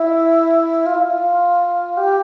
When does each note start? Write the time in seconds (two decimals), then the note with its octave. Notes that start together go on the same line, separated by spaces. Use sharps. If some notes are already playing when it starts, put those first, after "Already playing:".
Already playing: E4
0.86 F4
0.95 E4
1.03 F4
1.97 G4